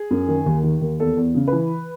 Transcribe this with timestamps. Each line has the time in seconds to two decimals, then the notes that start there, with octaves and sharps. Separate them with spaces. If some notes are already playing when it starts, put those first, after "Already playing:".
Already playing: G#4
0.11 F#2
0.28 D#3
0.46 D#2
0.63 D#3
0.81 D#2
1.00 E2 A4
1.17 E2
1.35 C#3
1.48 E3 B4